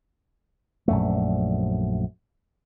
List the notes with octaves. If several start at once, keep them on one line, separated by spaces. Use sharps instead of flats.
A#1 F#2 A3